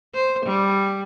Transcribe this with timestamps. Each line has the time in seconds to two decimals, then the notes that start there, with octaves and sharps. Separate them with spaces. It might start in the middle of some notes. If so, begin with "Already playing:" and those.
0.15 C5
0.45 G3